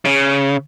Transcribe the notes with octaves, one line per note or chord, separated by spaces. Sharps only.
C#3